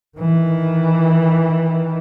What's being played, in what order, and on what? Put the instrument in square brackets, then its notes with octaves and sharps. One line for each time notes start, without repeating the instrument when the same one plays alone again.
[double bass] D#3 E3